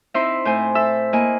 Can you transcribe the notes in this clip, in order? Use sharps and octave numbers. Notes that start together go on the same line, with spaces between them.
C4 D#4 E4 E5 C6
A2 C5 G#5
A4 E5 E6
A#3 E4 D#5 G#5